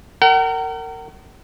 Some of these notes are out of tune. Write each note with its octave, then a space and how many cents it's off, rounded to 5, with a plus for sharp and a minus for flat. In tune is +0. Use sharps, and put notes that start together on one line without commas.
A#4 -30 F#5 +40